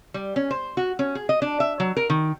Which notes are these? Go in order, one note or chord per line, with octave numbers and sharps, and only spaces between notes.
G3
C#4
C5
F#4
C#4
G#4
D#5
D4
E5
F#3
A#4
D#3